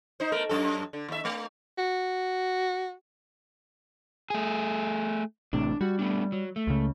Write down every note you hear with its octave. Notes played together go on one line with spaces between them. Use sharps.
D#4 C5
A3 B3 A#4
F#2 F#3 A4
D3
D#2 E5
A3
F#4
A3 G#4
A1 A2 C3 D4
G3 F#4
A3 B3 D4
F#3
A3
C#2 C#3